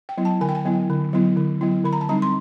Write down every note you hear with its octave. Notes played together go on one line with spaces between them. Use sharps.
G5
F#3 B3 E4
A5
D3 G#5
G5
G#5
F#3 B3 E4
D3
F#3 B3 E4
D3
F#3 B3 E4
D3 B5
A#5
A5
G3 C4 D#4 A#5
C6